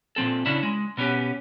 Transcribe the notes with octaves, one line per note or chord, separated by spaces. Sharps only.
A#2 F3 C4 A4
C#3 C#4 D4 E4
G#3
B2 B3 C#4 G4